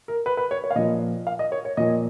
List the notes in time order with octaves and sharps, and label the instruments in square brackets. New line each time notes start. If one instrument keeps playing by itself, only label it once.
[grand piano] A#4
B4
B4
C#5
C#5
F5
A#2 F3 D#5
F5
D#5
C#5
C#5
A#2 F3 D#5